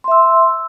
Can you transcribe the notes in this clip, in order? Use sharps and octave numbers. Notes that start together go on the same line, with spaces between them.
E5 C6 E6